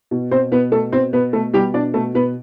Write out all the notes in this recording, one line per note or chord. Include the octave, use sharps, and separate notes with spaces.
B2
B2 C4 C5
B2 B3 B4
B2 A3 A4
B2 C4 C5
B2 B3 B4
B2 A3 A4
B2 G3 G4
B2 D4 D5
B2 A3 A4
B2 B3 B4